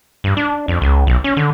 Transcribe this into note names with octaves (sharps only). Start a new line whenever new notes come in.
G2
D4
F2
C#2
B1
C#4
D3